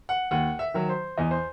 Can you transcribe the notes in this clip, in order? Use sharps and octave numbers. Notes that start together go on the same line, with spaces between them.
F#5
D#2 F#5
E5
D#3 F#3
C5
E2 D#5
C5